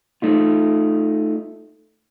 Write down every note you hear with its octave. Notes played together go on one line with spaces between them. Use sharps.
A3 D#4 F4